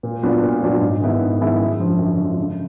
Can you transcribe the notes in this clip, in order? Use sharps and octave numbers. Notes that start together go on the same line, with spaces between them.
A#2
F#3 B3 D4 F4
A#2
F#3 B3 D4 F4
G#2
D#3 G#3 B3 E4
G#2
D#3 G#3 B3 E4
F#2
D3 F3
F#2
D3 F3
C#3